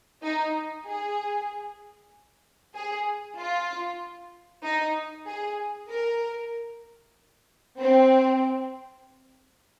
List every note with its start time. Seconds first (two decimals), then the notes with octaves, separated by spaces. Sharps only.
0.24 D#4
0.87 G#4
2.75 G#4
3.39 F4
4.64 D#4
5.27 G#4
5.89 A#4
7.79 C4